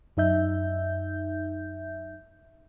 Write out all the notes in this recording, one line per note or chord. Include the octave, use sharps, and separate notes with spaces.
F#2 D#4 E5 G6